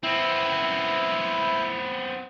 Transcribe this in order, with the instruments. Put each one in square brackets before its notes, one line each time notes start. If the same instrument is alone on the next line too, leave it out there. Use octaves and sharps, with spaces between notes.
[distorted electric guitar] B3 C4 [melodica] E4